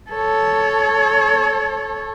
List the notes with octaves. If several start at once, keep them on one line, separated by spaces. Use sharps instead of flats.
A4 C#5